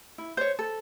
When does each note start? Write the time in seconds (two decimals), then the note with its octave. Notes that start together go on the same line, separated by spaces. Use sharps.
0.18 E4
0.37 C5 C#5
0.59 A4